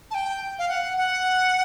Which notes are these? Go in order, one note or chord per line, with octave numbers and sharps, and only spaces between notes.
A5
G5
F5
F#5
F#5